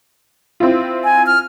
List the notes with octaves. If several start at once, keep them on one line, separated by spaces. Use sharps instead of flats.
C4 E4 F4
G#5
F6